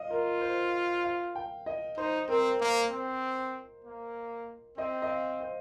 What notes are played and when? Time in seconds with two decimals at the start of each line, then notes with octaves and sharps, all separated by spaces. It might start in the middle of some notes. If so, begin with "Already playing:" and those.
Already playing: D#5 F5
0.10 F4 A#4
0.41 C5
1.04 F5
1.35 G5
1.66 D#5
1.97 D#4 C5
2.29 C4 A#4
2.60 A#3 C5
2.91 C4
3.84 A#3
4.78 C4 D#5
5.02 D#5
5.10 F5
5.41 C5